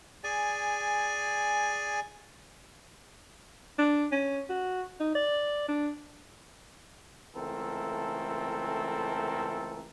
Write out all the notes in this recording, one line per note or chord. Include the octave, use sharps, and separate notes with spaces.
G#4 D5 G#5
D4
C#4
F#4
D#4
D5
D4
C#2 E3 A3 C4 A4 A#4